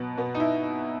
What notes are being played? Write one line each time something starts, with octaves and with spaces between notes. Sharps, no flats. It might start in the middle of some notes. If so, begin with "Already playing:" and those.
Already playing: B2 F#3 B3
B2 B3
D#4
E4